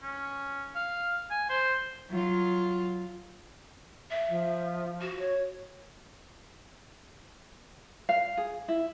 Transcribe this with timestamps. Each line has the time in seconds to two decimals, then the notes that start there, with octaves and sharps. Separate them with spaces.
0.02 C#4
0.75 F5
1.31 G#5
1.50 C5
2.10 F#3 F4
4.11 E5
4.29 F3
5.01 F#4
5.19 C#5
8.09 F5
8.37 G#4
8.68 E4